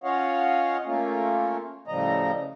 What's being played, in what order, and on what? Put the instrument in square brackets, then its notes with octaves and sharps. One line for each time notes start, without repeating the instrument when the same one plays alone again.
[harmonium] C#4 F4 C#5 D#5 F5 F#5
A3 A#3 C#4 F4
A2 C#3 F3 G3 D#5 A#5